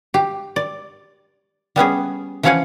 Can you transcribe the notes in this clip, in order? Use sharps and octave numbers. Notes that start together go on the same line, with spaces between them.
G4
D5
G3 B3 C#4 G#4
E3 F3 C#4 F5 F#5 G#5